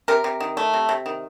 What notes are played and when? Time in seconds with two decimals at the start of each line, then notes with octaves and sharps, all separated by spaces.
0.08 C3 A#4
0.24 C3
0.40 D#3
0.57 A3
0.74 C3
0.89 C3
1.06 D#3